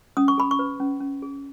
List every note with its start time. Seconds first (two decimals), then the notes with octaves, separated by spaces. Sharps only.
0.17 C#4 D#6
0.28 C#6
0.38 G#4 B5
0.51 C#6
0.59 B4
0.80 C#4
1.00 C#4
1.22 G#4